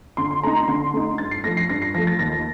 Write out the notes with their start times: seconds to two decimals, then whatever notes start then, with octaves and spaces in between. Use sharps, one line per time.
0.17 D3 C6
0.31 C6
0.43 A3 D#4 A#5
0.56 C6
0.68 D3 C6
0.93 A3 D#4
1.18 G2 A6
1.31 C7
1.44 F3 A3 A#6
1.57 C7
1.69 G2 A#6
1.82 C7
1.94 F3 A3 A#6
2.07 A6
2.19 D#2 A#6